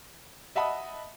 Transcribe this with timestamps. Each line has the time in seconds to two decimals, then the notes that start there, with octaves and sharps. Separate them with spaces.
0.55 D#5 E5 F#5 A5 B5 D#6